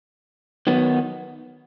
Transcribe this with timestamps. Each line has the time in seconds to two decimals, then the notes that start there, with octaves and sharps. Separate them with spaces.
0.67 D#3 F#3 B3